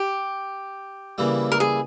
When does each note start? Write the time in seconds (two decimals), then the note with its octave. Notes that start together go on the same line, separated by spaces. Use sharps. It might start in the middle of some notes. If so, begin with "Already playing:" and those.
Already playing: G4
1.18 C#3 E3 G3 A#3 E4
1.52 A#4
1.60 G#4